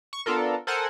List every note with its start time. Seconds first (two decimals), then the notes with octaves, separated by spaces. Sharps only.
0.13 C#6
0.26 B3 D4 F4 A4 A#4
0.67 A4 A#4 C5 F#5 G#5